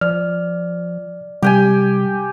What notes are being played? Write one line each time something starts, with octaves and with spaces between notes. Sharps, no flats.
F3 D5 F6
C3 G3 G4 G5 G#5